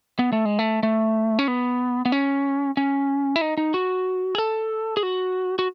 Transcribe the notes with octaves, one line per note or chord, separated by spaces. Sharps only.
B3
A3
G#3
A3
A3
C#4
B3
B3
C#4
C#4
E4
D#4
D#4
F#4
G#4
A4
G#4
F#4
F#4